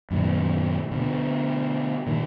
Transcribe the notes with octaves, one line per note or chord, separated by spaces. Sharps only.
F#2 A#2 D#3 B3
B2 D3
A#2 D#3 A#3